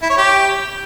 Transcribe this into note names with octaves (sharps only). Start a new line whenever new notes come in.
E4
C#5
G4